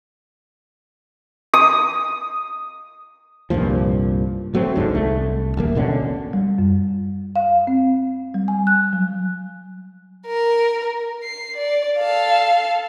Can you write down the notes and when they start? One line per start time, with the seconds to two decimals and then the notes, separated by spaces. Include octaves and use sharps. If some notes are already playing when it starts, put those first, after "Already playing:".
1.54 D#6
3.50 C2 G2 A#2 F3
4.54 A1 F#3 A3 C4
4.75 G1 E2 G#2 D3
4.92 C2 A3
5.57 D#1 A#1 A#3
5.75 A1 B2 D3 C#4
6.33 G3
6.58 F#2
7.36 F5
7.67 C4
8.34 G3
8.48 G#5
8.67 F#6
8.93 F#3
10.26 A#4
11.23 C7
11.57 D5
11.97 A4 F5